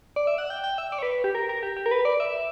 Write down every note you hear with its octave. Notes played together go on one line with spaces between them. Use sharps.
D5
E5
F#5
G5
G5
E5
D5
C#5
B4
G4
A#4
A#4
G4
G4
A#4
B4
D5
E5